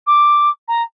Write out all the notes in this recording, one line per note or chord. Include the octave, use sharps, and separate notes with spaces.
D6
A#5